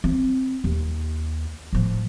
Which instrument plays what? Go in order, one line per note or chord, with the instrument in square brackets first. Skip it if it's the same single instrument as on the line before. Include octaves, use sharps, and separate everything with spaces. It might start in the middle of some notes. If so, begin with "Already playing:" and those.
[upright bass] C4
D#2
A2 F3